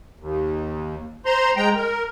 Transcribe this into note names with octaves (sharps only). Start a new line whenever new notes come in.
D#2
C5 A#5 C6
G#3 G5 A#5
A#4